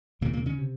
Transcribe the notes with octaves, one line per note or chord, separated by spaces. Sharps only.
D#2 A#2 C#3 A#3
A#2 A#3
C#3 C#4
C3